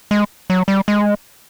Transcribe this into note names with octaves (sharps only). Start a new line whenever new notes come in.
G#3
F#3
G3
G#3